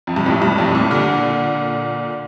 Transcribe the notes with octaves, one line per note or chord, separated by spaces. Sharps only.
F2
G2
F2 A2
G2
F2 A2
A2
G2 A#2
A#2 D3